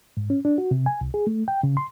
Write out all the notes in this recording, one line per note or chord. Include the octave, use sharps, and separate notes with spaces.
G#2
C#4
D4
F#4
C3
G#5
C2
G#4
A3
G5
C#3
C6